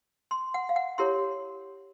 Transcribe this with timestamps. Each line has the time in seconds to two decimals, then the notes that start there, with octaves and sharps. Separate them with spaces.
0.31 C6
0.54 F#5
0.69 F5
0.76 F#5
0.98 E4 G4 A#4 C#5 C6